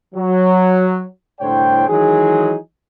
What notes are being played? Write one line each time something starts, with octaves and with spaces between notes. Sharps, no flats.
F#3
C2 A2 D3 C5 C#5 G5
D#3 E3 F#3 G#3 D#4 G#4